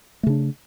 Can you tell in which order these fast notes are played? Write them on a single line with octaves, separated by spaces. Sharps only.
A3 C#3 D4